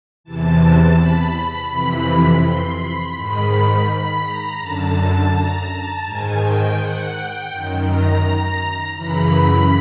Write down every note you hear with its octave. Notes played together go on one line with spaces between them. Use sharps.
E2 C3 E3 A5
A5
B5
F2 C3 E3
C6
B5
G#2 D#3 B5
B5
A#5
F#2 D3 A5
A5
A#5
A5
G#2 D#3 G#5
G5
F#5
G5
F#2 D#3
A#5
F#2 C#3 E3 B5